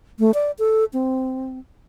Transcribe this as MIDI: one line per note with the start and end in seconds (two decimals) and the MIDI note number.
0.19 0.34 57
0.34 0.51 74
0.59 0.85 69
0.93 1.59 60